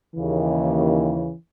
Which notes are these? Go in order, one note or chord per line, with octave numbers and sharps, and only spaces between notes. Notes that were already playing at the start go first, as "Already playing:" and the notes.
D#2 C#3 E3